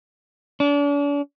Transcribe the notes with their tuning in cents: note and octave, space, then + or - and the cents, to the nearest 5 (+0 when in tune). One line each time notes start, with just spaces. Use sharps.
D4 -40